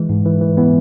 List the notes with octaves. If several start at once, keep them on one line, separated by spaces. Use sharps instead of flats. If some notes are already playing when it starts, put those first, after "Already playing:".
Already playing: E3 G#3
G#2
E3
E3
E3 B3